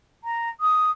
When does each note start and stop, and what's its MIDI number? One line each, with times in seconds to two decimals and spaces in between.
0.24 0.49 82
0.60 0.91 87